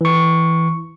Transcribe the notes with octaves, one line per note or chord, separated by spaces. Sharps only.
E3 C#6